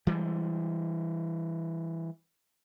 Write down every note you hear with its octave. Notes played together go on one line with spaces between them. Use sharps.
E3 G3 G#3